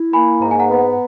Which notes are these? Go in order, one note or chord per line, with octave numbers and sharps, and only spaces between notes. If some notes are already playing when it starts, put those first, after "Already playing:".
Already playing: E4
A#3 G#5 B5
G#2 A#5
G#5
F#5 A#5
B3